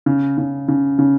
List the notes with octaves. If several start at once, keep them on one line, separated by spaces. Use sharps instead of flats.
C#3
C#3
C#3
C#3